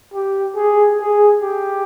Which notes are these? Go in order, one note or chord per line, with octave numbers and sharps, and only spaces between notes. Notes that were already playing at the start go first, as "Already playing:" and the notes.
G4
G#4
G#4
G4